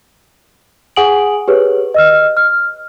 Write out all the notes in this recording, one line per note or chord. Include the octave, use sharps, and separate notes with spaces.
G#4 F#5 G#5 D#6 D7 F#7
G4 G#4 B4 C#5
D#5 E6 F6
F6